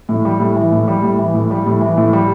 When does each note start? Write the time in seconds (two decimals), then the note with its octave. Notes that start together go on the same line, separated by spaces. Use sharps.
0.09 A2
0.25 G3
0.40 A2
0.56 E3
0.72 A2
0.88 G3
1.03 A2
1.18 E3
1.34 A2
1.51 G3
1.66 A2
1.81 E3
1.97 A2
2.13 G3